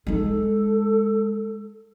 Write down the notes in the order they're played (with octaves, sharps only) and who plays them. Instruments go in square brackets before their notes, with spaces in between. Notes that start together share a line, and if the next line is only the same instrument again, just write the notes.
[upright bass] G#3 D#4 [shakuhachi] A4